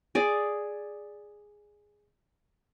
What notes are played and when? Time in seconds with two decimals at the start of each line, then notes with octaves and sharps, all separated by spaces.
0.15 G#4 D5